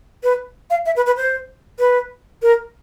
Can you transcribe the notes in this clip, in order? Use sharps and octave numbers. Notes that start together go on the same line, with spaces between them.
B4
F5
E5
B4
B4
C5
B4
A#4